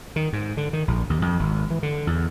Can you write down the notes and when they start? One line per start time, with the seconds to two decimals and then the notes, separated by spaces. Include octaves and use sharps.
0.16 D#3
0.33 G#2
0.57 D3
0.73 D#3
0.88 A#1
1.10 D#2
1.22 F2
1.39 G#1
1.70 E3
1.83 D3
2.07 E2